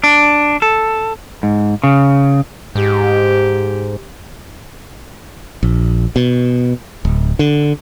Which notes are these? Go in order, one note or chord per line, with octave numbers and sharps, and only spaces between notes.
D4
A4
G#2
C#3
G#2 G4
A#1
B2
D1
D3